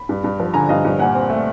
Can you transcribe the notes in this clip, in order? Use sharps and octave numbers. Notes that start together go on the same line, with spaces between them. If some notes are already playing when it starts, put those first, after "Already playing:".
Already playing: B5
G2
G2
F3
D3 G#5 A#5
G2 D#5 F5
G2
A#2 F#5 G#5
C4
A3